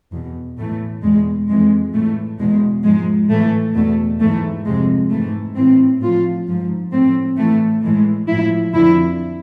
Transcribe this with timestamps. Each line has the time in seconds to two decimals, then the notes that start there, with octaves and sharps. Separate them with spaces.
0.13 E2 B2
0.58 A2 E3 A3
1.03 E2 B2 G#3
1.48 F2 E3 G#3
1.94 A2 E3 A3
2.40 E2 B2 G#3
2.84 G#2 F3 G#3
3.30 A2 E3 A3
3.75 E2 B2 A3
4.21 G#2 E3 A3
4.66 F2 C3 F3 G#3
5.12 G#2 E3 A3
5.56 A2 E3 C4
6.02 A2 F3 F4
6.48 G#2 F3
6.93 A2 F3 C4
7.38 A2 E3 A3
7.84 A2 E3 G#3
8.29 A2 F3 E4
8.75 F2 D3 F3 E4